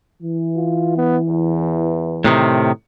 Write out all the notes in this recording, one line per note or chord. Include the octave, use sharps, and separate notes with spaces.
E3
F4
B3
E2
A2 C3 D#3